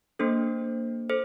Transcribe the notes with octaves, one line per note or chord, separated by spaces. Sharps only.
A#3 D4 A4 C5
A4 C5